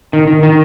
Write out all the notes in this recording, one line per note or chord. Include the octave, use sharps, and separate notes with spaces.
D#3
D#3
D#3